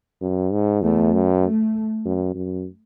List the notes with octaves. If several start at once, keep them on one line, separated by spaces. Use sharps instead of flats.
F#2
G#2
E2 A3
F#2
A3
F#2
F#2